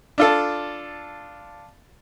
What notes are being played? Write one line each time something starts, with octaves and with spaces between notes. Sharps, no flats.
D4 F4 A4